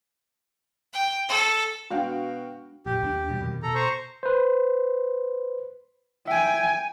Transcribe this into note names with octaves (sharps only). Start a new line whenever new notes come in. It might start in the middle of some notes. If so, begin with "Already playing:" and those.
G5
A4
B2 G#3 D4 F#4 F5 G5
F1 A#1 G4
D#2 C4 D4
B2 F#3 G3
F2 B2 D#3
B2 A4 A#5
C5 A#5 C#6
B4 C5
E5 G5 G#5